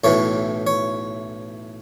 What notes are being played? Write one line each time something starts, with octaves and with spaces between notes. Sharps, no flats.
B1 A2 E3 C#5
C#5